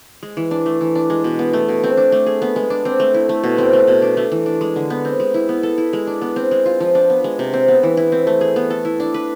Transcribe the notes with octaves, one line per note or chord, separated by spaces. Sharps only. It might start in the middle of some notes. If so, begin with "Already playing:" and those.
G#3
E3
D4
A3
E3
D4
G#3
B2
B3
A3
B2
C4
D4
A3
G#4
B3
G#3
D4
C4
A3
E4
A3
B2
C4
A3
B2
D4
A3
E3
D4
G#3
D3
B3
C4
G#3
E4
B3
A4
E4
G#3
D4
B3
C4
G#3
F4
F3
D4
B3
G#3
C3
C4
B3
E3
E4
C4
A3
G#4
B3
A4
E4
D4
B4